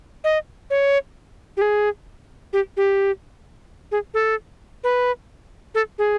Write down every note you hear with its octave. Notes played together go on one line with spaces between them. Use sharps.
D#5
C#5
G4
G#4
G4
G4
G#4
A4
B4
A4
G#4